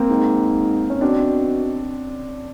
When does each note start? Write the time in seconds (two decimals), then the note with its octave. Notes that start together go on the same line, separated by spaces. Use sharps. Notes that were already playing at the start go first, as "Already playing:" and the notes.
Already playing: A#3 C4
0.09 G#2
0.90 C#4
1.01 B2 C4 D4